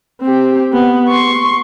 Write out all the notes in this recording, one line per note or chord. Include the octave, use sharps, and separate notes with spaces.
C4 G4
B3
C6 C#6